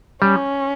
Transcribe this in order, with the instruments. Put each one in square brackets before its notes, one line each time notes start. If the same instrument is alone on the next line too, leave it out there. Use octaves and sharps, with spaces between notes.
[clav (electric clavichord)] G3 [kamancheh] C#4